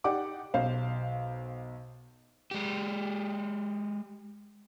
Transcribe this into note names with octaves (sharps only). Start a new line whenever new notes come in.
D#4 G4 D5 F#5 D6
B1 C5 F5
G#3 G4